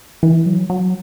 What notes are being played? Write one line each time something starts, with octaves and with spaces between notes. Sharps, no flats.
E3
F#3
F#3